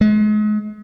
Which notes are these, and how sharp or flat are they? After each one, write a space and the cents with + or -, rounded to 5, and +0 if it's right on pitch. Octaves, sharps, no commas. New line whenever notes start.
G#3 +35